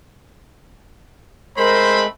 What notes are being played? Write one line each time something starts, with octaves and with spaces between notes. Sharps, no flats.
G#3 A3 C4 A#4 C5 B5